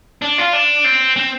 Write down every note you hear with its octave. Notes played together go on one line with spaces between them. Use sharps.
D4
F4
D4
C4
C4